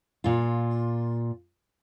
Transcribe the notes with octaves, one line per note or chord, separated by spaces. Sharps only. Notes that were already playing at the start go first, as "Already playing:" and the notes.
A#2 F4